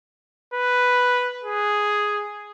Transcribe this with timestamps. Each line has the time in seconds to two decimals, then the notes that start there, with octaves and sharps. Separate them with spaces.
0.54 B4
1.44 G#4